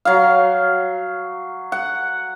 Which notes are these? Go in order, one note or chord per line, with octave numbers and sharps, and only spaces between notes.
F#3 F5
F#5